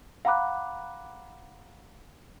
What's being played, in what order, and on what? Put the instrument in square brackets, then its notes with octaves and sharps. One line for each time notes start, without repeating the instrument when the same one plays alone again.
[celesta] F5 F#5 A#5 B5 D6 F#6